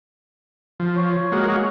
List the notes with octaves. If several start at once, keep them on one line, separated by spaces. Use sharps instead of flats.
F3
C#5
G#3 A#3 F#4